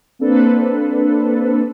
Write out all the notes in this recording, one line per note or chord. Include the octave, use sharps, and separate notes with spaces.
A#3 C4 D4 A4 B4